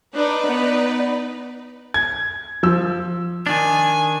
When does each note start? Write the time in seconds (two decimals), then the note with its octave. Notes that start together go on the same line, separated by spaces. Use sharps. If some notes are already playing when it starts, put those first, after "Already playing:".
0.15 D4 D#4 B4 D5
0.46 B3
1.94 G#6
2.63 F3 E6
3.47 D#3 D4 G#5